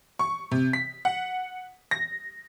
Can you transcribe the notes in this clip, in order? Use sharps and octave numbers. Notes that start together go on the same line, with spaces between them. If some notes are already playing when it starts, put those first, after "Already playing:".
C#6
C3
B6
F#5
A#6